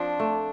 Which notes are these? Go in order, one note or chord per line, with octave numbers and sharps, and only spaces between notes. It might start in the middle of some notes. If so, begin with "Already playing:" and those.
Already playing: F3 C4 D4
A3